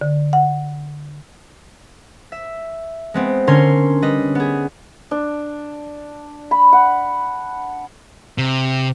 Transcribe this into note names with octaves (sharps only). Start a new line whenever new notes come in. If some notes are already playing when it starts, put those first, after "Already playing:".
D3
F#5
E5
G#3 B3 C4
D3 C#4 A#4 C#5 C6
G3 B4 D#5
B3 G#4
D4
B5
F#5
C3